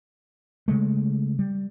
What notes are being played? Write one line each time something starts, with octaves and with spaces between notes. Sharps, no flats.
C#3 G#3 A3
G3